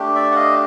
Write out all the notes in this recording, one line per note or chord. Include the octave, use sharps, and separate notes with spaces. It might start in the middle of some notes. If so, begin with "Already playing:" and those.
Already playing: A3 D4 G4
D5 E5
F#5
D#5 F5